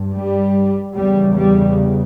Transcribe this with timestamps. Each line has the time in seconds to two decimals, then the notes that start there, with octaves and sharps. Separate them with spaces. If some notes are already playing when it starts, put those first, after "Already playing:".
Already playing: G2
0.13 G3
0.94 E2 C#3 G3
1.35 G3